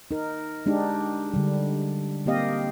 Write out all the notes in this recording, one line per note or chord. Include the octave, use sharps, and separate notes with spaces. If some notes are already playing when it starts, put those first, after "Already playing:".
D#4 A#4
G#3 D4 D#4 G4
D3 G3
A#3 C4 G4 D#5 F5